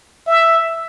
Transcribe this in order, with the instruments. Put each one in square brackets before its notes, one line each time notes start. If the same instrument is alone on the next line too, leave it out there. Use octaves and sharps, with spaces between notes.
[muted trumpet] E5